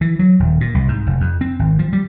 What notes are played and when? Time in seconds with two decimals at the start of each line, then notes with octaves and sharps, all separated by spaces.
0.01 E3
0.19 F#3
0.40 D#1
0.61 A#2
0.75 C2
0.88 G#2
1.06 F1
1.21 F2
1.41 C4
1.59 G#1
1.79 F3
1.93 G3